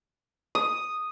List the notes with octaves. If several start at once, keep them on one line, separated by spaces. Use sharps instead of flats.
D#6